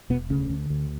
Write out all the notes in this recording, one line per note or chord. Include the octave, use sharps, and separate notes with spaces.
E1 B2 B3
D2 C#3 C#4
D3
D2